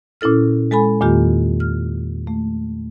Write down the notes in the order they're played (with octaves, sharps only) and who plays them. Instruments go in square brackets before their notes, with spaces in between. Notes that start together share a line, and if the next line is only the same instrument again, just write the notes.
[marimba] A#2 C#4 E4 A4 F6
G#3 A4 G#5 B5
E2 A#2 D#3 A#3 F4 G4
F6
A3